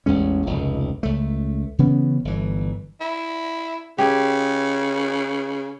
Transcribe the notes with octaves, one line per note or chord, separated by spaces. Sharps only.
A1 E2 G#3 C#4
F1 C#2
C#2 A3
C#3 E3 B3 C#4
G1 E3
E4
C#3 G4 G#4